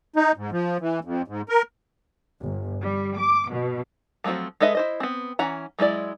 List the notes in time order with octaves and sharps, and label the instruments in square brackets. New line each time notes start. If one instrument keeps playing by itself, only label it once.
[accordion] D#4
G#2
F3
E3
F2
G#2
A#4
[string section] G1
G3
D6
B2
[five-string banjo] F3 F#3 A3 C4 F#4
G#3 A4 B4 D#5 E5
E4 C5 D#5
B3 C4
E3 C#4 F#5 A#5
F#3 G#3 E4 D5